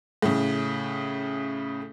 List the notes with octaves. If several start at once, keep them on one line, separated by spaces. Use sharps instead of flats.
A2 C#3